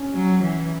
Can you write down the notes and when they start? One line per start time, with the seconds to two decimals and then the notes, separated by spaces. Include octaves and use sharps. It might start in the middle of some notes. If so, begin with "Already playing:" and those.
Already playing: C#4
0.15 F#3
0.43 E3